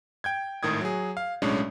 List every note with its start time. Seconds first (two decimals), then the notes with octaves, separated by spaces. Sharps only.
0.24 G5 G6 G#6
0.63 G#1 A2 D#3 D#6 G#6
0.81 F#3 G#4
1.17 F5
1.42 B1 A2 G#3 C#4 D4